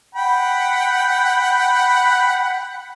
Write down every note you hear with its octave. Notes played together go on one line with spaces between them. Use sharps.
F#5 G5 B5